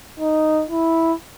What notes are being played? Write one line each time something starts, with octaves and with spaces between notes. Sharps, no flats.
D#4
E4